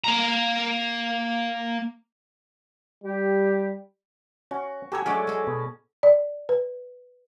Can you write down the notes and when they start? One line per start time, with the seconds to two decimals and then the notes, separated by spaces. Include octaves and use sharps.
0.04 A#3 A#5
3.04 G3 G4
4.51 C#4 F#4
4.92 F#4 G4 A4 C5 C#5 G#5 A#5 E6
5.06 F#3 G#3 A3 C#4 D4 F#4 D5
5.27 G#3 A4
5.47 B2
6.03 D5
6.49 B4